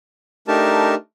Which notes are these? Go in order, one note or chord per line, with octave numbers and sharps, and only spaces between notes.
A3 D4 D#4 G4 A#4 A5